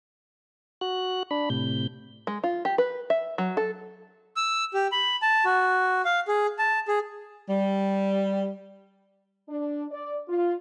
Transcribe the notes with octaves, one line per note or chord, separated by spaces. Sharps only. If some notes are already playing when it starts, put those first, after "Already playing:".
F#4 F#6
D4 B5
A2 C3 G6
G#3
F4
G4
B4
E5
F#3
A4
E6
G4
B5
A5
F#4
F5
G#4
A5
G#4
G3
D4
D5
F4